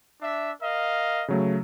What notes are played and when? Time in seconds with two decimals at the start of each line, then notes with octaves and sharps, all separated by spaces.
0.22 D4 E5
0.62 A#4 D#5 F5
1.28 C#3 F#3 A3